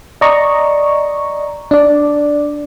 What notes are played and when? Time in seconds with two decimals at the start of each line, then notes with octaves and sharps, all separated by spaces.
0.21 D5 D#5 A#5 C#6
1.71 D4 D5